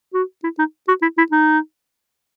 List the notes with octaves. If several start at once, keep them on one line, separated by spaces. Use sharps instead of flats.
F#4
E4
D#4
F#4
E4
E4
D#4